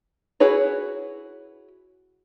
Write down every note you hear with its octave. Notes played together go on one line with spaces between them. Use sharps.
E4 F#4 G#4 B4 C#5